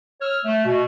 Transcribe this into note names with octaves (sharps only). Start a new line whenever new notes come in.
C#5 E6 F6
A3
B2